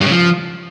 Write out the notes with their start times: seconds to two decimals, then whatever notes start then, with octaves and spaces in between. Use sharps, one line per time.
0.01 G2
0.06 C#3
0.11 F3